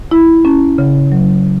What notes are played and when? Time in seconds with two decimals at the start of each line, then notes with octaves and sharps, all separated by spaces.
0.11 E4
0.45 C#4
0.78 C#3
1.12 F#3